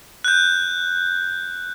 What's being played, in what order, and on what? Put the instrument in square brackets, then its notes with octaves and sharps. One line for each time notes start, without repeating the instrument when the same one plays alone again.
[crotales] F#6 G6